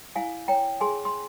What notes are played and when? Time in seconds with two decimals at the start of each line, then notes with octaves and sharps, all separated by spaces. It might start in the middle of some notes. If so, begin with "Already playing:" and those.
0.16 E4 F5 G#5
0.48 C#5 G5 A#5
0.81 G#4 G#5 C6
1.05 C6